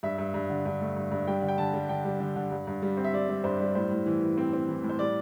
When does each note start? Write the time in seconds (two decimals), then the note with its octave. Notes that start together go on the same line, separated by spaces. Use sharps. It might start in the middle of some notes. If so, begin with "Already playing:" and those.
0.03 G2 E5
0.18 G2
0.34 G2
0.50 D3
0.66 G2
0.81 A3
0.96 G2
1.12 G2
1.27 G3 G5
1.42 D3
1.48 G5
1.58 D3 A5
1.74 G3
1.89 D3 G5
2.05 G3
2.20 D3
2.36 D3
2.51 G2
2.67 G2
2.82 G3
2.97 C4
3.04 E5
3.14 G3 D5
3.29 G3
3.44 G2 C5
3.60 G3
3.75 A2 C5
3.91 A2
4.06 E3
4.21 E3
4.38 C4
4.53 C4
4.68 E3
4.83 A2
4.89 C5
4.99 G3 D5